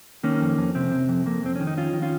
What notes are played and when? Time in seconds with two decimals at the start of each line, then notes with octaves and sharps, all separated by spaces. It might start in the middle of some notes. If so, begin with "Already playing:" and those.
0.23 D#3 A#3 C#4
0.41 F2
0.58 F2
0.75 C3 C4
0.92 C3
1.09 F2
1.26 F2 A#3
1.43 F2 C4
1.56 D#3 C#4
1.67 D#4
1.77 F2 C#4 F4
1.93 D#3
2.02 C#4 F4